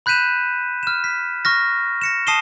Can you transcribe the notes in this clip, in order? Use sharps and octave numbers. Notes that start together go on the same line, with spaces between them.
B5 F#6 G6 B6 D#7 E7
F6 E7
B6
C#6 F6 A#6
A#6 C#7 E7
A5 D#6 C7 D#7 E7 G7